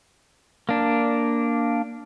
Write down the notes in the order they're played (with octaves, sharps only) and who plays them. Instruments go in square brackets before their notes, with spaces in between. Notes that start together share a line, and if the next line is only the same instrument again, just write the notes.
[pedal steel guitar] A#3 D4